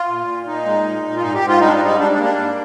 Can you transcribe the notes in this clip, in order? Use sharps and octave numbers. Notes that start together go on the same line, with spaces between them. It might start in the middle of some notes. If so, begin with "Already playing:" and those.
Already playing: F4
A#2
A#2
A#2 D#4
G#3
A#2
A#2
F4
G#2 D#4
G4
G#2
F4
G3 D#4
D4
D#4
G#2
D#4
G3 D4
D4
A#3
D4
G#2